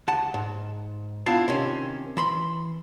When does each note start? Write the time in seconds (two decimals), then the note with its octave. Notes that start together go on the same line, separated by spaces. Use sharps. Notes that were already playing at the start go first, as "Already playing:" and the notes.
0.08 C#2 F#5 A5
0.34 G#2
1.26 B3 D4 E4 F4 F5 A5
1.48 C3 D#3 C#4
2.17 E3 B5 C6